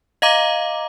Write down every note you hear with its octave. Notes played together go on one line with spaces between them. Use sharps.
D#5 F5 A#5 D6